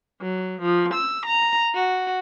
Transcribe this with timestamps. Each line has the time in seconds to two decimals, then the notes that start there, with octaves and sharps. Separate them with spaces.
0.21 F#3
0.63 F3
0.94 E6
1.28 A#5
1.75 F#4